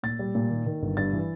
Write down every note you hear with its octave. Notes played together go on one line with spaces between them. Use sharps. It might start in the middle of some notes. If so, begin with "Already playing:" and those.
A#2 A6
G3
A#2
D#3
D#3
G1
G2 A6
E3